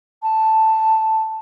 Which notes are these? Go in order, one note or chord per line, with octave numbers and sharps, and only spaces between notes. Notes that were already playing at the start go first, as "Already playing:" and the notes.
A5